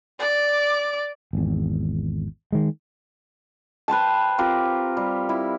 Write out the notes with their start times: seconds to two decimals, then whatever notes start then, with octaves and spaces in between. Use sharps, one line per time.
0.19 D5 D6
1.33 G#1 E2
2.52 D#3 G#3
3.88 B4 C5 G5 A5
4.38 C4 F4 G4 A#4
4.97 G3
5.29 E4